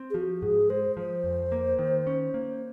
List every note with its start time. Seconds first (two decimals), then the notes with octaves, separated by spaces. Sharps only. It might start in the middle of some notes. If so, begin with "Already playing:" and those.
Already playing: C4
0.10 G#4
0.14 F3 F#4
0.42 G#2 G#4
0.70 G#3 C5
0.96 F3 C5
1.24 F2
1.52 A#3
1.79 D#3
2.07 C#4
2.34 A#3